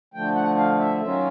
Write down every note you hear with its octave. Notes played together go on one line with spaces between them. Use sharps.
D3 F3 A3 G5
F#5
F5
E5
D#3 F#3 A#3 C#4 F4 E5